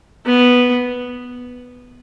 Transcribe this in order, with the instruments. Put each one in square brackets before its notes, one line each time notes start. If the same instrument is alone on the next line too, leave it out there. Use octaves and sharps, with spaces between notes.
[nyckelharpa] B3